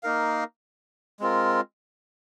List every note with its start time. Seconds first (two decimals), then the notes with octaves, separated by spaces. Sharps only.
0.03 A#3 D#4 A#4 F5
1.20 G#3 C4 F4 A#4